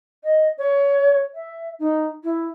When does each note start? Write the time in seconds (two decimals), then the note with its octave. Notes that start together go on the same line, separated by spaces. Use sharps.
0.23 D#5
0.57 C#5
1.34 E5
1.79 D#4
2.23 E4